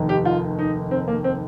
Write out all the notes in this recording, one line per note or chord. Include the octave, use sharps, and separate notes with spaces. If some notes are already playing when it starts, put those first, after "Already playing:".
Already playing: F1 D#2 D#3
G4
F4
D#4
C4
A#3
C4